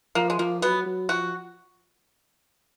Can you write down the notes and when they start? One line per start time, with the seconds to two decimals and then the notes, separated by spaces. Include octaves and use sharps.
0.15 F3 A#3
0.30 G#3
0.39 F3 A#3
0.62 F#3 B3
0.86 F#3
1.09 F3 F#4